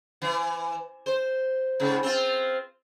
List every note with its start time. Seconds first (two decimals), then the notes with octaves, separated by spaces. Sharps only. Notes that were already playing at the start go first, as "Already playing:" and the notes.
0.22 E3
1.06 C5
1.80 G#2 C#3
2.03 C4 F4